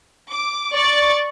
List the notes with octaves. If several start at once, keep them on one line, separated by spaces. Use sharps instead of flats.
D6
D5 C#6 A6